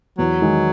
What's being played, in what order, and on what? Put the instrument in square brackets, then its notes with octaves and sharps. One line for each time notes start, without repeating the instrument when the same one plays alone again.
[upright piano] E2 [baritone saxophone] F#3
[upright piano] D#3 G#3